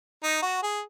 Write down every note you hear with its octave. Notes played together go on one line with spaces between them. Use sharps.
D#4
F#4
G#4